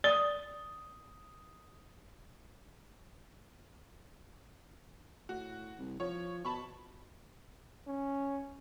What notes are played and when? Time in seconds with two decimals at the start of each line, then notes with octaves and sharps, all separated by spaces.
0.04 D5 D#6 G7
5.29 A2 F#4
5.79 C2
6.00 F3 C#5
6.45 B2 A5 B5 C#6
7.87 C#4